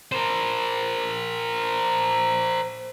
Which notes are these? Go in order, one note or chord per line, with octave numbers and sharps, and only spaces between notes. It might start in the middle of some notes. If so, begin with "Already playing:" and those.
A#4 C5